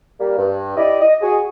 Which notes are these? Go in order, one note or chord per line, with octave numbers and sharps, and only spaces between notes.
G3 A#3
G2
E4 G4 D5 D#5
D#5
F#4 G#4